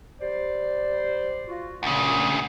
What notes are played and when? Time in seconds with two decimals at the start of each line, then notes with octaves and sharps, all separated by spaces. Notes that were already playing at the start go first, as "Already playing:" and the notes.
0.21 G3 C5 D5
1.49 F4 F#4
1.83 D2 A#2 C#3